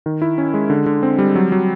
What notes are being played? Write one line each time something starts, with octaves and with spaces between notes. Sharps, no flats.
D#3
E4
C#4
G#3
D3
D3
C4
G3
F#3
F#3